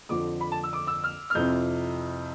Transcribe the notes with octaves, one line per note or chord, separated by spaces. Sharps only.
F2 D3 F3 C4 D6
B5
A5
E6
D6
E6
F6
F6
F2 C3 F3 C4 E4 G6